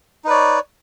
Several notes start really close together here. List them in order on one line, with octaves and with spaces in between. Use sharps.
D#4 B4 D5 C#5